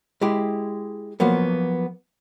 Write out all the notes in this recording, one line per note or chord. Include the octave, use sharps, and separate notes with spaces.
G#3 E4 G4
F3 F#3 A#3 B3